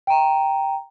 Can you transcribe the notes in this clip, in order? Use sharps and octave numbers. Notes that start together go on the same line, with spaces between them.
G5 A#5